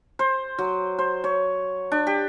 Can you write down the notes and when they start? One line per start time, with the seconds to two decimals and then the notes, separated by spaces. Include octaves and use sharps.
0.19 C5
0.58 F#3
0.98 C5
1.24 C#5
1.92 D4
2.07 G4